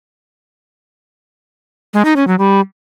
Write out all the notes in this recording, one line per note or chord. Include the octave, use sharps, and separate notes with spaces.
G#3
D#4
C#4
F#3
G3